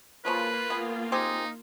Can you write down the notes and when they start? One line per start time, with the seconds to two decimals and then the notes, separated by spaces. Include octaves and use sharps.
0.25 C#3 F3 F#3 A#3 F4 B4
0.70 B3 G#4
1.12 C4 D#4 G4 G#4